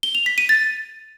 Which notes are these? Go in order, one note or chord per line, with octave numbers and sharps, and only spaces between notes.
G7
F7
B6
D#7
A6